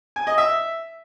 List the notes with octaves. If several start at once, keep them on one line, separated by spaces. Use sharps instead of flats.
G#5
D#5
E5